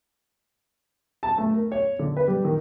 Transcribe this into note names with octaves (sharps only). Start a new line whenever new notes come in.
A5
A3
A#4
C#5
D3
B4
G3
D#3